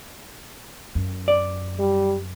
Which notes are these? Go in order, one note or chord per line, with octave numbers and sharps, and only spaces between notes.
F#2
D5
G3